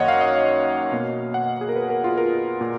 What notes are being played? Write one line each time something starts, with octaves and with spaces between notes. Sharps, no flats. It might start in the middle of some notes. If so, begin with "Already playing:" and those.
Already playing: F#2 D#3 A#3 C#5 D#5 F#5
F5
D#5
F5
B2 A#3
F#5
G#4
A#4
B4
A#4
F4
A#4
A#2